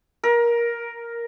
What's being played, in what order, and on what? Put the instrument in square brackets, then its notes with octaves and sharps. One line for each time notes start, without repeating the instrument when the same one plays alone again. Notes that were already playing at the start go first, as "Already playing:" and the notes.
[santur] A#4